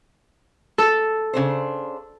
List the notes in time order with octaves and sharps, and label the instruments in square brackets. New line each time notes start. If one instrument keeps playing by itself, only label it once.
[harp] A4
[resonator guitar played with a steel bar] C#3 D4 C5